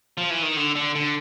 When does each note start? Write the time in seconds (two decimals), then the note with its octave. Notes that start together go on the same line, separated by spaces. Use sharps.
0.18 F3
0.30 E3
0.43 D#3
0.56 D3
0.75 D3
0.95 D3